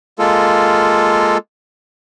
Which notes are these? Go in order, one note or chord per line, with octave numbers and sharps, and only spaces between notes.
G#3 A#3 F4 A4